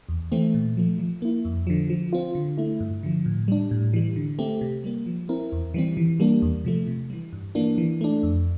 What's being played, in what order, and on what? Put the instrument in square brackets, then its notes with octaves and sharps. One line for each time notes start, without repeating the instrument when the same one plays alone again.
[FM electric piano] E2
E3 A3 C4
A#2
F3 A3
F3
A#3 E4
F2
D3 F3
F3
C4 F4
D3
A3 E4
G2
D3 F3
A2
G3 D4
A2
E3 G3
D3
A3 C4 G4
C3
G3 A#3
F3
C4 E4 A#4
E2
E3 G3 C4
E3
G3 A#3 D4
E2
C3 F3 A3
C3
E3 G3
G2
E3 A#3 D4
E3
A3 D4
F2